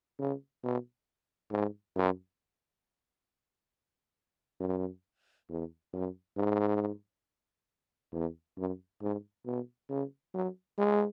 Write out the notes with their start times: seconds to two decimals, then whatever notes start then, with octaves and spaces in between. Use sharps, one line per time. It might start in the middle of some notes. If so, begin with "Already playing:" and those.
0.20 C#3
0.64 B2
1.52 G#2
1.96 F#2
4.60 F#2
5.49 E2
5.93 F#2
6.37 G#2
8.13 E2
8.57 F#2
9.02 G#2
9.46 B2
9.89 C#3
10.34 F#3
10.78 G#3